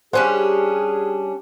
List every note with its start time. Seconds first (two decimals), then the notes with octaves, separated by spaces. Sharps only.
0.13 G3 C#4 D4 G#4 C5 F#5